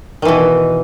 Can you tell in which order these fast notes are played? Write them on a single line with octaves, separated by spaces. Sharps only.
D#3 E3 B2